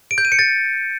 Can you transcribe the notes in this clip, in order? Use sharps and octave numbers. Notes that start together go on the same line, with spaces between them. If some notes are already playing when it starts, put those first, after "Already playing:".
D7
G6
D#7
C#7
A6